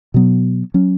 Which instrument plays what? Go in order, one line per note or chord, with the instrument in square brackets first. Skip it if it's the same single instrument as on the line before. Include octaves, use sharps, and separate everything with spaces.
[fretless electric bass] B2 F#3 B3
F#3 C#4